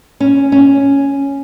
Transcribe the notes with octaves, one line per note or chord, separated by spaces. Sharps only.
C#4
C#4